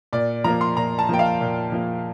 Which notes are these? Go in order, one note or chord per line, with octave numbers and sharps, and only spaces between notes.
A#2 D5
F3 A#3 A#5
C6
A#2 A#5
A5
F3 A#3 G5
F5
A#2
F3 A#3